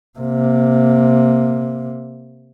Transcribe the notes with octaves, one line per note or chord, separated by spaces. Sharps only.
C3 A#3